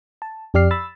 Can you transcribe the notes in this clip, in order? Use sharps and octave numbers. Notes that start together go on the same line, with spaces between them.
A5
F2 G4 D5 F6 C7
B5 E6 A6